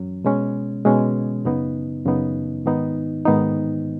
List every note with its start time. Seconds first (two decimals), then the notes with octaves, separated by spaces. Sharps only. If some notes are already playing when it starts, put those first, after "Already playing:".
Already playing: F#2 F#3 C#4
0.24 B2 G#3 C#4
0.85 B2 G#3 C#4
1.45 F#2 C#3 B3 D#4
2.05 F#2 C#3 B3 D#4
2.66 G#2 D#3 B3 D#4
3.25 G#2 D#3 B3 D#4